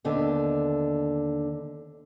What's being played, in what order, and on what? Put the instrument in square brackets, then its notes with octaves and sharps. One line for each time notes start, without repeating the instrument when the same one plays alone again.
[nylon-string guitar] D#2 D3 B3 C4